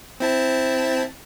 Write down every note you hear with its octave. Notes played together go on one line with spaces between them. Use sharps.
C4 E4 A5